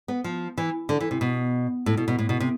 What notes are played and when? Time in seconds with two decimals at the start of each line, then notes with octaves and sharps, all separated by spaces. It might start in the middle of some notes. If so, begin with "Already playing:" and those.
0.08 B3
0.24 F3
0.58 E3
0.89 D3
1.00 E3
1.11 C3
1.21 B2
1.86 A2
1.97 B2
2.08 B2
2.19 A2
2.29 B2
2.40 C3